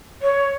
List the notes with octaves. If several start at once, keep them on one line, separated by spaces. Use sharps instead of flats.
C#5